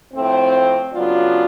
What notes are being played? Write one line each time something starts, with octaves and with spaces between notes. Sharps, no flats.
A2 F3 A3 C4
C#3 F#3 B3 D4 F4